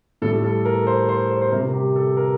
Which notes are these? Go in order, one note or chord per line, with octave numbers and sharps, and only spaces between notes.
A2 G3 A4
A4
A#4
C5
C5
C5
C5
C3 G3 A#4
G4
A4
A#4